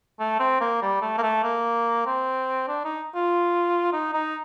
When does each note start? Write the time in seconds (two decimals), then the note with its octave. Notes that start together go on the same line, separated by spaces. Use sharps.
0.20 A3
0.40 C4
0.61 A#3
0.82 G3
1.02 A3
1.18 A#3
1.23 A3
1.44 A#3
2.06 C4
2.68 D4
2.85 D#4
3.15 F4
3.93 D#4
4.14 D#4